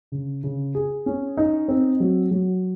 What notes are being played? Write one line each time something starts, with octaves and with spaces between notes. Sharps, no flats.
C#3
C#3
G#4
C#4
D#4
C4
F#3
F#3